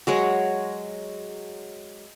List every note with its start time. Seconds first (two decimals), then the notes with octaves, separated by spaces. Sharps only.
0.07 F#3 G#3 C#5